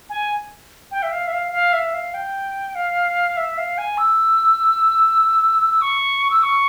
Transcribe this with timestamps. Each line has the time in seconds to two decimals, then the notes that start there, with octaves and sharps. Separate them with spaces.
0.10 G#5
0.91 G5
1.03 E5
1.12 F5
1.27 E5
1.32 F5
1.52 F5
1.73 E5
1.94 F5
2.14 G5
2.75 F5
3.37 E5
3.57 F5
3.78 G#5
3.98 E6
5.71 E6
5.81 C#6
6.31 E6
6.43 C#6